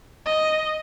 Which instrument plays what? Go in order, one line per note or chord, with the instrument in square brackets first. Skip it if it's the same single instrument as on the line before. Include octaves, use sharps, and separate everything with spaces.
[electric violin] D#5